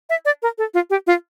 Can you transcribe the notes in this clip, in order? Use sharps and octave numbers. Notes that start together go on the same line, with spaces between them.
E5
D5
A#4
A4
F4
G4
F4